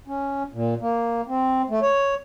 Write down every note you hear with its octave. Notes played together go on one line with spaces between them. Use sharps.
C#4
A#2
A#3
C4
A3
C#5